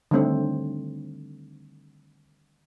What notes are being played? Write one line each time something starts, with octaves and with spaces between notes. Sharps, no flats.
D3 D#3 G3 A3 C4 C#5